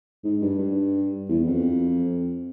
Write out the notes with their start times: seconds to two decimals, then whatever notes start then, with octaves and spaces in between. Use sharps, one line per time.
0.24 G#2
0.42 G2
0.58 G2
1.29 E2
1.47 F2